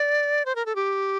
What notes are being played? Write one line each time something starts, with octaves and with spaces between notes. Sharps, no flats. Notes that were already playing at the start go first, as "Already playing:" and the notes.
Already playing: D5
C5
A#4
A4
G4